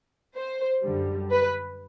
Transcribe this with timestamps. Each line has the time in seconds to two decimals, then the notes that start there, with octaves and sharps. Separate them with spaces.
0.35 C5
0.83 F#2 D3 G3
1.31 B4